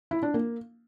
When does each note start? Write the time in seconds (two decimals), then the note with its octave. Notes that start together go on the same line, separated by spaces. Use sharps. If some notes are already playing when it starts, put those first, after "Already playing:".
0.11 E4
0.23 D4
0.34 A#3